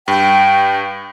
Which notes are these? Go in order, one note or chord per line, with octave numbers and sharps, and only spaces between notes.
G2 G5